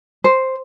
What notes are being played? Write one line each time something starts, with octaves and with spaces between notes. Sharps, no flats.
C5